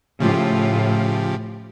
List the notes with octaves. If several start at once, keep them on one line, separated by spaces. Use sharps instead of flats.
A2 C#3 F3 F4 G4